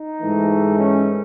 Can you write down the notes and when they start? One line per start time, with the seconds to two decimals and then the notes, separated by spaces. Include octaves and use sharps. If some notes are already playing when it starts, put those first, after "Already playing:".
Already playing: D#4
0.22 G#2 E3 A3
0.79 C#4